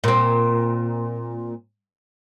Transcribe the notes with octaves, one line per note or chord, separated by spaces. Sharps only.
A#2 C4